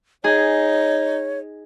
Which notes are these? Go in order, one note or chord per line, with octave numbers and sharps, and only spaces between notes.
D#4 G#4 C#5